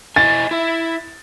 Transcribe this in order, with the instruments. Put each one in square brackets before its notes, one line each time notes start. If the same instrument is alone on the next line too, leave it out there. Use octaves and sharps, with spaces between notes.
[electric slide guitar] E4 D#5 G#5 [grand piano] A6
[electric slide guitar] E4 E5